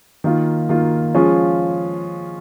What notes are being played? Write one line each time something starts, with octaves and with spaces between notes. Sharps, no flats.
D#3 A#3 F4
D#3 A#3 F4
F3 G#3 C#4 F4